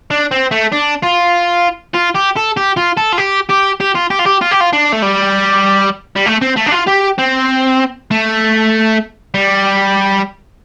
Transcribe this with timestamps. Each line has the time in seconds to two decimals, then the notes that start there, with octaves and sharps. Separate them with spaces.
0.11 D4
0.31 C4
0.51 A3
0.72 D4
1.03 F4
1.94 F4
2.15 G4
2.37 A4
2.57 G4
2.77 F4
2.97 A4
3.13 F4
3.18 G4
3.49 G4
3.80 G4
3.95 F4
4.10 G4
4.19 F4
4.26 G4
4.41 F4
4.51 G4
4.60 F4
4.73 D4
4.92 A3
5.02 G3
6.16 G3
6.26 A3
6.42 C4
6.57 A3
6.67 D4
6.72 F4
6.88 G4
7.19 C4
8.11 A3
9.35 G3